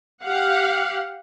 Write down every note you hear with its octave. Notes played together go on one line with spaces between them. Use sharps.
G4 F5 F#5